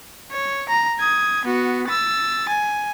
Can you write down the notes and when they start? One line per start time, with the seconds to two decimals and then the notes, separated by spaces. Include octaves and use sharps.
0.32 C#5
0.69 A#5
0.99 D#6 G#6
1.45 B3 F#4
1.88 E6 A6
2.49 G#5